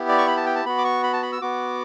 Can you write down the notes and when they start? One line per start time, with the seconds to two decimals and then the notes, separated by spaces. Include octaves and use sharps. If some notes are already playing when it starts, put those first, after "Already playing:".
Already playing: B3 E4 G4
0.09 D5
0.18 C#6
0.27 B5
0.37 A5
0.46 G5
0.56 A5
0.65 B3 F#4 B5
0.78 D6
0.85 C#6
1.04 B5
1.13 A5
1.23 B5
1.32 E6
1.42 B3 F#4 D6